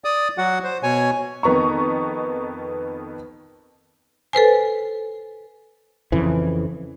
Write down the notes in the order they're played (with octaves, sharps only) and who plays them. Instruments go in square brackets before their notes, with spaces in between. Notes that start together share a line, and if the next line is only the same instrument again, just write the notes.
[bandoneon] D5 D#6
F#3 F#4 F#5
C5
B2 C#5 G#5
[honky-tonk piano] F2 D#3 B3 A#5 C#6
[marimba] A4 B4 C5 G#5
[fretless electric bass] F2 C#3 E3